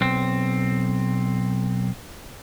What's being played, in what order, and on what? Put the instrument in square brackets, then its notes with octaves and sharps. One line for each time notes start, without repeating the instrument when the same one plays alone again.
[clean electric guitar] B1 C4